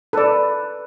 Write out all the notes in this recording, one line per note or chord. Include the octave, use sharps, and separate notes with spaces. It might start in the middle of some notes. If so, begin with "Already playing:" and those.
A4 B4 D5